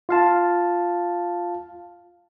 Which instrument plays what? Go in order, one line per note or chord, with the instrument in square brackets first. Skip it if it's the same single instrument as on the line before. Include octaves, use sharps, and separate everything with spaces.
[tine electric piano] F4 F5 A5